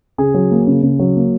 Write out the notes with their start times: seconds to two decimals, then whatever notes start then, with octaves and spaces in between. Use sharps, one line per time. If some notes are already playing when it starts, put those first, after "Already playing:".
0.18 C#3 G#4
0.34 F#3
0.51 A#3
0.67 C#3
0.83 C#3
0.99 F#3
1.16 A#3